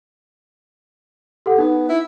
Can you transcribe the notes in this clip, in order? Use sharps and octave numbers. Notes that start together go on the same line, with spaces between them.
G4 A4 F#5
B3 D#4
E4